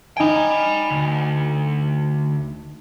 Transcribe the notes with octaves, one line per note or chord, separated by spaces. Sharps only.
D#4 G5 G#5 B5
D2